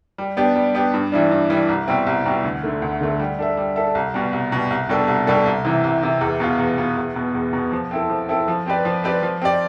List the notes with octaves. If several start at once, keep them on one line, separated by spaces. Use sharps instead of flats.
G3
B3 D4 G4
G3
B3 D4 G4
G2
E3 G3 D4
G2
E3 G3 D4
C2
B2 G3 C4 E4
C2
B2 G3 C4 E4
D2
D3 A3
D2
D3 A3
G3
D4 A4 E5
G3
D4 A4 E5
C2
B2 G3
C2
B2 G3
C2
B2 G3 D4 A4
C2
B2 G3 D4 A4
C2
C3 E3
C2
C3 E3
E2
B2 B3 F4
E2
B2 B3 F4
E2
B2 B3
E2
B2 B3
F3
C4 E4 A4
F3
C4 E4 A4
F3
C4 G4 B4 D5
F3
C4 G4 B4 D5
F3
C4 G4 D5